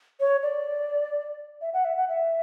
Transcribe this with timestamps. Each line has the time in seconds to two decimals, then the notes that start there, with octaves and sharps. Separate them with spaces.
0.20 C#5
0.43 D5
1.61 E5
1.73 F#5
1.85 E5
1.97 F#5
2.09 E5